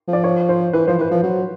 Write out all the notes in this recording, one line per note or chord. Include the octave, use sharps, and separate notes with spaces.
F3
D5
C#5
C5
E3 B4
F3 C5
E3 B4
F3
F#3